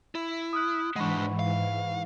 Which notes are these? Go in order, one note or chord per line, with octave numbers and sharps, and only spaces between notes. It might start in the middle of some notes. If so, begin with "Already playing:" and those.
E4
D#6 F6 F#6
G#2 E3 G#3 D4 F#5 B5 C#6
F5